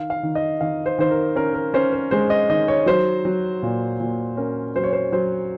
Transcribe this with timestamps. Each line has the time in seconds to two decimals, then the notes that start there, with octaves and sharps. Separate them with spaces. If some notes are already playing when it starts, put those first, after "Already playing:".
Already playing: D#3 F5
0.10 F5
0.23 D#3
0.35 D#5
0.61 D#3 F5
0.86 C5
0.99 D#3 C5
1.11 A#4
1.36 C#4 A#4
1.54 A#4
1.74 C#4 C5
1.93 C5
2.11 G#3 C5
2.30 D#5
2.50 D#3 D#5
2.68 C#5
2.86 F#3 C5
3.25 F#3
3.63 A#2
4.00 A#2
4.37 C#4 A#4
4.75 F#3 C5
4.84 C#5
4.93 C5
5.12 F#3 C5